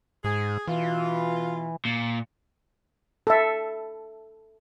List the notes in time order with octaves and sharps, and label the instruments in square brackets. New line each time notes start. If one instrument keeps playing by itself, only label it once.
[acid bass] G#2 [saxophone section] G#4
[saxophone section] B2 F4 [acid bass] E3
[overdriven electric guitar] A#2
[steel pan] A4 E5